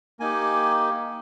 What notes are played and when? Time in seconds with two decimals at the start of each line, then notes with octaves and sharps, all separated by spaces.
0.20 A#3 D#4 G4 G#5